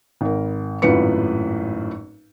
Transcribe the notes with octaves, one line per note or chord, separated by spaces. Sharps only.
G#1 A#4
G#1 F#2 A2 F4 B4 C#7